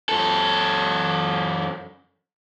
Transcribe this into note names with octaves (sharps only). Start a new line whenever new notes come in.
F#2 A4